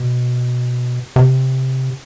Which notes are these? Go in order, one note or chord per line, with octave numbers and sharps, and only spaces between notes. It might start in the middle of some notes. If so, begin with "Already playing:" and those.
Already playing: B2
C3